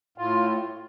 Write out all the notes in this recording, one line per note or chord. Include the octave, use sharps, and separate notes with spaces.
A2 F4